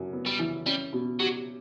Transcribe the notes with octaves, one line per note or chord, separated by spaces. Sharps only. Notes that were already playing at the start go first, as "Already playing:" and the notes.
Already playing: F#2
B3
G3
E3
G3 C#4
B2
F#3 G4